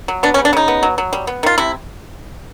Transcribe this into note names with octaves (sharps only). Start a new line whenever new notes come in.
F#3
B3 D4
C#4
C#3
D4
C#3 D#4
B3
F#3
F#3
G3
B3
D#3 F4
C3 E4